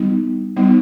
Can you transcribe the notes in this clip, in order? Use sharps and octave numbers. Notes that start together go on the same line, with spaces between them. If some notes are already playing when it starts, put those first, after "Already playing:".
Already playing: G3 B3 D#4
G3 B3 D#4